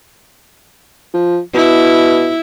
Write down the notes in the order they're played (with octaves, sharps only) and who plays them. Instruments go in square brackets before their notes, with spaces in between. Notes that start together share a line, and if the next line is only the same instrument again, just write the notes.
[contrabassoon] F3
[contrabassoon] B2 [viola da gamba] E4